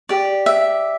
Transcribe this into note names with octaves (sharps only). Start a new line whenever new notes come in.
G4 D5
E5